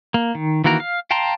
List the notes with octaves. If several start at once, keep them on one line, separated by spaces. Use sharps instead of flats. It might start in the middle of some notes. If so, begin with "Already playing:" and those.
A#3
D#3
D#3 E3 A#3 F#4 A#4
F5
F5 G5 A5 A#5 C6